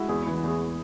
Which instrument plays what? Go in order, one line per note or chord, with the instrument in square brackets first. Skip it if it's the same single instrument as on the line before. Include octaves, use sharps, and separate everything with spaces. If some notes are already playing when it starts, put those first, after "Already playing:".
Already playing: [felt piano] G#3 [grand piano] E4 F#4
[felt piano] E2 [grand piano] G#4
[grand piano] E4
[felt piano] E3
[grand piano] E4
[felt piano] E2 [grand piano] G#4